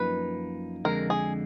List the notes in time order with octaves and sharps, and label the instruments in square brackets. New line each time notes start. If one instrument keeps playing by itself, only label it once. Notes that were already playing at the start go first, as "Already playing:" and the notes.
Already playing: [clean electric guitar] F#2 F3 A#3 D#4 [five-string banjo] B4
[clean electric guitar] F2 D3 G#3 [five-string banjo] A#4
[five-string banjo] G#4